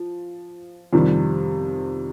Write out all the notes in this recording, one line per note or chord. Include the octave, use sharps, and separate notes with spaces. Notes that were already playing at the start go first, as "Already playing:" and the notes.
Already playing: F3
F2 C3 D#3 G3